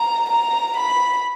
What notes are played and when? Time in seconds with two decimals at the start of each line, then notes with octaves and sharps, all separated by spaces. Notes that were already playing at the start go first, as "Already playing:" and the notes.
Already playing: A#5
0.29 A#5
0.76 B5